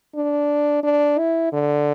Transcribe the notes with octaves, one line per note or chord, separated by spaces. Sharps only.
D4
D4
E4
D3